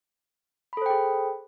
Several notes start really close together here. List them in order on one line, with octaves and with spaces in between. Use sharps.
B5 A4 C5 G5 G#4